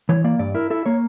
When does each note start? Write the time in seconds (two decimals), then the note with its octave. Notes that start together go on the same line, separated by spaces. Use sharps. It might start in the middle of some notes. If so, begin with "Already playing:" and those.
0.09 E3 C#5
0.24 A#3 D5
0.39 G2 D5
0.55 E4 A#4
0.70 E4 A4
0.86 A#3 C#5